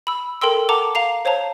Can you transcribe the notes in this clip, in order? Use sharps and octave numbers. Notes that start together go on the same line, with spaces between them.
B5 E6
A4 A#4 G5 C6 E6
F#5 A5 A#5 D6
F5 A#5 C7
C5 C#5 F5 A5 A#5